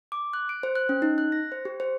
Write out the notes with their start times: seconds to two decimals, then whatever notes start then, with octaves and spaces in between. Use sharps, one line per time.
0.12 D6
0.33 F#6
0.49 D7
0.63 C5
0.76 F#6
0.89 C#4
1.02 D#4
1.18 F#6
1.32 A#6
1.52 C5
1.65 G4
1.80 C5